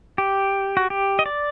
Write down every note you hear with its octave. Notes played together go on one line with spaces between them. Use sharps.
G4
F#4
G4
D#5
D5